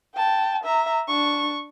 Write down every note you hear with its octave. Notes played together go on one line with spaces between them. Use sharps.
G5 A5
E5 A#5
D4 C#6